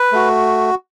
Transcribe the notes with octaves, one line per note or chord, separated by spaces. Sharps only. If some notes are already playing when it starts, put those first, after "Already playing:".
Already playing: B4
A3 F#4